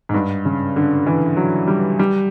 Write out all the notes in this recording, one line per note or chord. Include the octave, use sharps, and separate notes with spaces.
G#2
G2
C#3
D3
E3
F#3
G3
G3